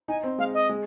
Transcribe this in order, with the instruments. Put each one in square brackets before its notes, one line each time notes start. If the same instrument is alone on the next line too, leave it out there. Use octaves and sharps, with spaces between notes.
[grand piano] D#4 [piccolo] G#5
[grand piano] C4
[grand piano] G#3 [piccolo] F5
[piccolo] D#5
[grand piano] G#3